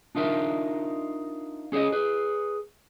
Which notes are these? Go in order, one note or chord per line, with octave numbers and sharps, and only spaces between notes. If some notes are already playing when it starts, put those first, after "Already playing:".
D4 D#4 F4 A#4 E5
C#4 G#4 C5 C#5 D#5
G#4 B4